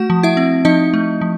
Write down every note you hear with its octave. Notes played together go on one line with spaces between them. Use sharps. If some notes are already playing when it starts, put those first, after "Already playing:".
Already playing: A3 F#4 F#5
F3
E4 E5
C4
F3 D#4 D#5
A3
F3